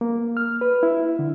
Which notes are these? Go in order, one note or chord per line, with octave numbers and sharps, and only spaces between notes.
A#3
F6
B4
E4
D3